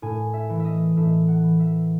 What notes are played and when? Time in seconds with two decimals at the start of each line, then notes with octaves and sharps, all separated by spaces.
0.02 A2 G#5
0.33 E5
0.50 E3
0.60 E5
0.65 D#5
0.96 A2 E5
1.28 F#5
1.44 E3
1.60 E5